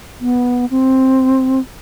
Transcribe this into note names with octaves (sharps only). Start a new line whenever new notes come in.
B3
C4